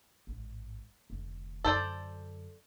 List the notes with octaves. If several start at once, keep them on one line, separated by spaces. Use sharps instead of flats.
A1 G#2
F1 D3
F#2 D3 A4 C5 D5